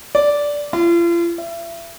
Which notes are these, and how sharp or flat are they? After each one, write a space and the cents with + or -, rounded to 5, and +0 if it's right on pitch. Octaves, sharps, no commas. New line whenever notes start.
D5 -10
F4 -40
E5 +35